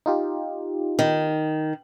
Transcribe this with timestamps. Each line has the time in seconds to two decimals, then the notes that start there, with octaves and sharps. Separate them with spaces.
0.06 D#4 F4 G4
0.99 D#3